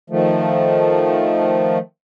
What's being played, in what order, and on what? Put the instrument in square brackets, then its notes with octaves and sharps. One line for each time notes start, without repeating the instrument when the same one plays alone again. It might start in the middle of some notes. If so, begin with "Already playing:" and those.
[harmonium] D#3 F3 A3